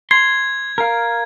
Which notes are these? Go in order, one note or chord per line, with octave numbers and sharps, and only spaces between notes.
C6 G#6
A#4 F5